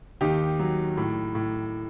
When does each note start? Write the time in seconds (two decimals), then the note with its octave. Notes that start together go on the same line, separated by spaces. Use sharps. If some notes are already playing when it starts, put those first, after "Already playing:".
0.21 D#2 D#4 G4
0.60 F#3
0.97 A2
1.35 A2